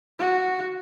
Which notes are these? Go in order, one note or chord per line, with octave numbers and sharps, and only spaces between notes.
F#4